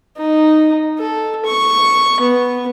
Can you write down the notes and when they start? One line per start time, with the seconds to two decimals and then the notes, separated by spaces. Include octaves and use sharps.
0.17 D#4
0.99 A4
1.46 C#6
2.20 B3